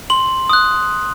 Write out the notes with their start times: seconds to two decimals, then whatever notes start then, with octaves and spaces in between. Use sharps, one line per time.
0.10 C6 F#7
0.49 D#6 F#6